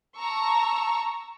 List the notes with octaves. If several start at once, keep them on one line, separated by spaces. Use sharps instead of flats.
A5 A#5 C#6 E6